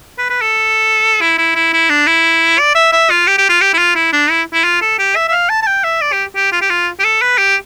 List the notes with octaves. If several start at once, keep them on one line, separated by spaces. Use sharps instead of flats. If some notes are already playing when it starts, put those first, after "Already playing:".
B4
B4
A4
E4
E4
E4
E4
D4
E4
D5
E5
E5
F4
G4
G4
F4
G4
E4
F4
E4
D4
E4
E4
F4
A4
G4
E5
E5
F5
A5
A5
G5
E5
D5
G4
G4
F4
G4
F4
G4
A4
B4
G4